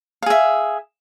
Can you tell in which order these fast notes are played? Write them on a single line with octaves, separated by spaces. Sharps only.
F5 G#4 E5